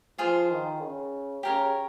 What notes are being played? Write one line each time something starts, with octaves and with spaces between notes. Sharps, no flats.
F3 F4 G#4 C5
D#3
C#3
C#3 G4 A#4 C#5